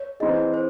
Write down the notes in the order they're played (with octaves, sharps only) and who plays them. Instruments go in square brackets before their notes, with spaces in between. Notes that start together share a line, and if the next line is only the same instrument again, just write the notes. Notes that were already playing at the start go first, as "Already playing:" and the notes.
Already playing: [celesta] C#5
[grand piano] E3 C4 D#4 G#4 [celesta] D#5
[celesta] C5